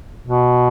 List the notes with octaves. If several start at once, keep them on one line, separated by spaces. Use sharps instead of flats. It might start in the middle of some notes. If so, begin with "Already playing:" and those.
B2